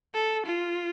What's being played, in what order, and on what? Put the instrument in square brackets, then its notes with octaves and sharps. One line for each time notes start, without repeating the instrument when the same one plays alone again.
[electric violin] A4
F4